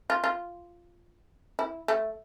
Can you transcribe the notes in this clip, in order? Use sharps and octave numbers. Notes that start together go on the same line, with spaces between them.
F4
F4
E4
A3